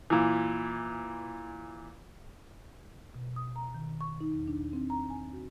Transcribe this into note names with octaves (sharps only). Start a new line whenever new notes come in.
A#2 E3
B2
D#6
A#5
D#3
C#6
D#4
E2
D4
C4
A#5
G#5
F#4